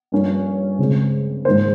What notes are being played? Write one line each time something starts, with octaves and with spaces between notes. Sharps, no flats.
G2 F3 A#3 C#4
C#3 G#3 C4
G#2 D#3 A#3 C5